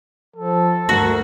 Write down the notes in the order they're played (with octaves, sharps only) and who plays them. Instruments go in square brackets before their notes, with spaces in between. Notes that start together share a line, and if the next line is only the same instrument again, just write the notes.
[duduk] F3 [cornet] A4
[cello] D2 G2 [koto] F#4 [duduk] A#4